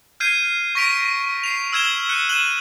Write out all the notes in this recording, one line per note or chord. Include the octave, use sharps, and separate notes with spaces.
F6 G6 G#6 C7 D#7
C#6 A#6 B6 D7 F7
C7 F7
E6 F6 G#6 E7 F7 G7
F#6 C#7 D#7 G7
F#6 D#7 E7 F#7 G7